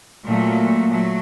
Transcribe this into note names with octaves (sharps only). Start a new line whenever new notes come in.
A#2 F#3 A3
F#3 A3